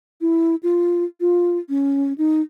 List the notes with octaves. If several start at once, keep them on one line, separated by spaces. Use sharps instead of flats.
E4
F4
F4
C#4
D#4